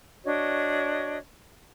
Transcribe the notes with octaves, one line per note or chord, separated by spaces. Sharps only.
D4 F#4 C#5 D#5